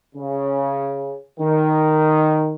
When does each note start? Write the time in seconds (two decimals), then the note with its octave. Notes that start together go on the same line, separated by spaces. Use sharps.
0.15 C#3
1.40 D#3